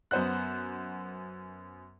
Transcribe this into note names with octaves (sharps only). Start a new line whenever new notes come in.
F#2 B3 C5 F#5 F#6